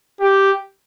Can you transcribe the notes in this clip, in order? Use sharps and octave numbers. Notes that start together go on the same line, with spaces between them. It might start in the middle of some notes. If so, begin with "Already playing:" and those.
G4